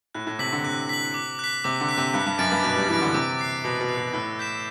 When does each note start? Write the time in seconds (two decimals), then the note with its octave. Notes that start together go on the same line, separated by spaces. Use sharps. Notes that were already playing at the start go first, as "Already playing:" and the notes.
0.14 A2 F#6
0.27 A2
0.39 C3 B6 F#7
0.52 D3
0.64 C3 F#6
0.89 B6 F#7
1.14 D6
1.39 F#6 B6
1.64 C3 D6
1.81 D3
1.89 F#6 B6
1.97 C3
2.14 G2 F#6
2.26 G2
2.38 F#2 A6 D7
2.52 G2
2.63 B2 F#6
2.76 G3
2.89 E3 A6 D7
3.02 D3
3.14 C3 D6
3.39 F#6 C7
3.64 B2 D6
3.81 B2
3.88 F#6 C7
3.97 B2
4.13 A2 E6
4.39 G6 B6 E7